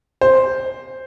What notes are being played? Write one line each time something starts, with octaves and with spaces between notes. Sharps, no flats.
C5